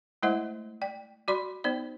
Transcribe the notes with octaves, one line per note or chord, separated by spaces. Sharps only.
G#3 A3 E4 C5 D#5 F#5
D5 G5
F#4 D5 B5 C6
B3 D#4 C5 D5